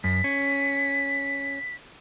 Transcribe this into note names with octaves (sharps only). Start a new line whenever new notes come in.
F#2 B6
C#4